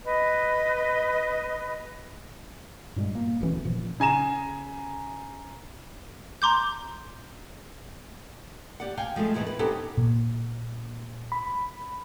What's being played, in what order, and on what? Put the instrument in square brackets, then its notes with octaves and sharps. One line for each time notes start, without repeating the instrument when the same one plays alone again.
[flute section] B4 D#5
[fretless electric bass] G2 A#2 G3 G#3
A#3
E1 D2 E3 C#4
A#2 F3
[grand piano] C#3 G#5 A#5 E7
[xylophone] A#5 C6 D6 G6
[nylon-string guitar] G4 D5 F#5
F5 G5 G#5
F3 G#3 A3 F4
E2 A2 E3 G#3 B3
B4
B3 C#4 D#4 G4 A4 C5
[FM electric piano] A#2
B5